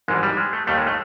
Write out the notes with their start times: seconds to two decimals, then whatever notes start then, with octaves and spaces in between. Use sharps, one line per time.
0.08 G#1 G#2 E3 G3 G#3
0.23 G3
0.37 G#3
0.53 A3
0.67 D#2 D#3 G3 A3
0.78 G#3
0.87 A3